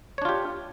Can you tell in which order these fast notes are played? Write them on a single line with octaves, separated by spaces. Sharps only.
C#5 D4 F4 G4